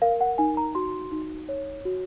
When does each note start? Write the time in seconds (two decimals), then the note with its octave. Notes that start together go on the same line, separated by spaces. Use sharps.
0.02 A#4 F5
0.21 F#5
0.38 D#4 G#5
0.57 A#5
0.75 F#4 C6
1.12 D#4
1.49 C#5
1.85 F#4